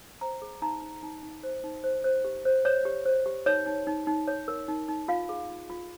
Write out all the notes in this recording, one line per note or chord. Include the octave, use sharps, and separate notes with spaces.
C5 A#5
G#4
D#4 A#5
D#4
D#4
D#4
C5
D#4
C5
C5
G4
C5
C5 C#5
G4
C5
G4
D#4 C#5
D#4
D#4
D#4
C#5
A#4
D#4
D#4
F4 F5
G#4
F4
F4